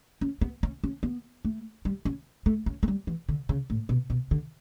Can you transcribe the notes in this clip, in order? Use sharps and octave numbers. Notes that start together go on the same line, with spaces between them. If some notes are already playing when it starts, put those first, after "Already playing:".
C#4
B3
C#4
C#4
B3
A3
G3
C#4
A3
C#4
A3
G3
E3
D3
C#3
A2
B2
B2
D3